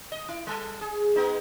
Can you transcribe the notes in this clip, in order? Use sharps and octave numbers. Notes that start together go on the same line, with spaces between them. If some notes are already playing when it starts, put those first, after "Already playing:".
D#5
E4
G3 A4
G#4
G#3 B3 D#4